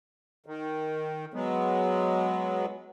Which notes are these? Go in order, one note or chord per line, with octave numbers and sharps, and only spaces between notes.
D#3
F#3 G#3 B3